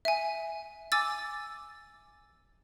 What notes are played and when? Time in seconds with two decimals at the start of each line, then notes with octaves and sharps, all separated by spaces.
0.05 E5 G#5
0.92 G#5 D6 E6 A6